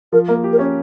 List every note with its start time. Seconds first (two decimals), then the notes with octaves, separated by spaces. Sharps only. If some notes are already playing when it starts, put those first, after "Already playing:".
0.12 F3 A#4
0.28 A#3 A#4
0.44 G4
0.52 A#4
0.59 C#4 C#5